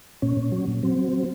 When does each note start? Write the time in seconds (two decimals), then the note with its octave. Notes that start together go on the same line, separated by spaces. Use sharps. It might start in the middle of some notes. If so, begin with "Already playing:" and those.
0.22 A#2 C#4
0.37 A#2
0.52 F#3
0.68 A#2
0.83 F#3 C4
0.98 F#3
1.13 F#3